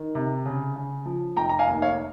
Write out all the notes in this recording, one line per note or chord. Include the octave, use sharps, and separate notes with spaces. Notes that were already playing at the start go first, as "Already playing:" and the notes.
Already playing: D#3
C3
C#3
C#3
F3
F1 G5 A#5
A#5
F5 G#5
D#2
C#5 F5